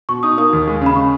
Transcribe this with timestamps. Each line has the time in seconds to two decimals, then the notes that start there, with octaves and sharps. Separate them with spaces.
0.09 B2 C#6
0.23 D#4 D#6
0.38 A#3 D#6
0.53 D#2
0.67 G#3
0.81 C#3 B5
0.96 C#6